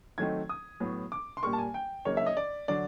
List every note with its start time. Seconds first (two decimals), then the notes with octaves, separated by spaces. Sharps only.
0.18 D#3 F#3 A3 C4 D#4 G#6
0.49 D#6
0.80 A2 F#3 B3
1.12 D6
1.37 C6
1.43 A#2 G3 A#3 C#6
1.53 A5
1.58 G#5
1.74 G5
2.05 C#3 F#3 A#3 D#4 C#5
2.17 E5
2.26 D#5
2.37 D5
2.68 D3 F#3 D5